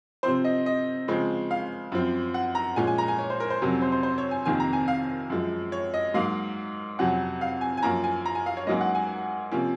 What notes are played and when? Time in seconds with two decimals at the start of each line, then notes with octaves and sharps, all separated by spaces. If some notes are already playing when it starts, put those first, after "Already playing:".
0.23 C3 F3 C4 C5
0.45 D#5
0.66 D#5
1.08 C#3 F3 G#3 C4
1.51 F5
1.92 F#2 F3 C4
2.34 F#5
2.55 A#5
2.76 A#2 F3 G#3 C#4 G#5
2.87 G#5
2.98 A#5
3.08 G#5
3.19 C#5
3.30 C5
3.40 A#4
3.50 C5
3.61 F2 C3 F#3 C#4 A#4
3.82 C5
3.92 C5
4.03 C5
4.18 C#5
4.31 G#5
4.45 F2 C3 D#3 A#3 G#5
4.60 A#5
4.73 G#5
4.88 F5
5.30 F#2 F3 G#3
5.72 C#5
5.94 D#5
6.14 G#2 F#3 A#3 F5
6.99 F2 C3 F#3 C#4 F#5
7.41 F5
7.61 G#5
7.77 G#5
7.83 F#2 F3 A#3 C#4 A#5
8.04 G#5
8.26 A#5
8.35 G#5
8.46 F5
8.57 C#5
8.67 G#2 F#3 A#3 C#4 D#5
8.81 F#5
8.95 G#5
9.52 C3 F3 A#3 C#4